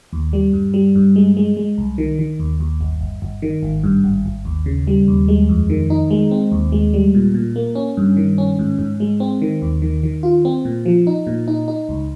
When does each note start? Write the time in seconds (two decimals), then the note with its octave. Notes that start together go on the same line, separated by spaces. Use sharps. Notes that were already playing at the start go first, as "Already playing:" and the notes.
0.13 D#2
0.33 G3
0.53 G2
0.74 G3
0.95 G2
1.16 G#3
1.37 G#3
1.57 G#3
1.78 C2
1.98 D#3
2.19 D#3
2.39 D#2
2.60 D#2
2.81 G1
3.01 G1
3.22 G1
3.42 D#3
3.63 G#1
3.84 G2
4.04 G#1
4.26 G#1
4.45 D#2
4.66 C#3
4.87 G3
5.08 D#2
5.28 G#3
5.49 F2
5.70 D#3
5.90 D#4
6.10 G#3
6.31 C4
6.52 D#2
6.72 G#3
6.94 G3
7.15 A#2
7.34 A#2
7.56 A#3
7.75 C#4
7.97 G2
8.17 D#3
8.38 C#4
8.59 G#2
8.79 G#2
9.00 G#3
9.20 C4
9.42 D#3
9.62 D#2
9.82 D#3
10.03 D#3
10.23 F4
10.45 C4
10.65 A#2
10.86 F3
11.07 D#4
11.27 A#2
11.48 D#4
11.68 D#4
11.89 C#2